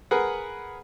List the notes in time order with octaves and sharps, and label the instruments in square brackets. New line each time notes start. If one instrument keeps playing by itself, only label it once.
[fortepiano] G#4 A#4 B4 F#5